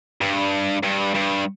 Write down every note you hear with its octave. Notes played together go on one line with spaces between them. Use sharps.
G2
G2
G2